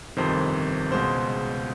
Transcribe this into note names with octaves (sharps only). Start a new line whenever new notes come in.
G1 F2 C3 D#3 C5
C#2 B2 G#3 C5